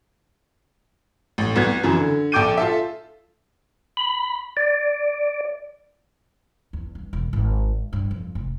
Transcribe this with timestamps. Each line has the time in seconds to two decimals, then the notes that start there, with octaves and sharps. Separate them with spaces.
1.38 A1
1.56 C2 B3 G#6
1.83 F#2 C#3 E3 F#3
1.97 D3
2.32 A#1 A4 G5 D6 G6 D#7
2.57 F4 A4 E5
3.97 B5
4.57 D5
6.73 E2
6.95 G2
7.13 E1
7.33 G#1
7.93 G2
8.11 F2
8.35 F1